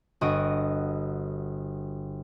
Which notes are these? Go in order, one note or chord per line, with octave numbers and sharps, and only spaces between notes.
G1 F#4 D#5 D7 D#7